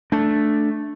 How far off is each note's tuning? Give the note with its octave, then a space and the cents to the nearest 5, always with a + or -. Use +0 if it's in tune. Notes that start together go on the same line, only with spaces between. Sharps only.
A3 +0 D4 +0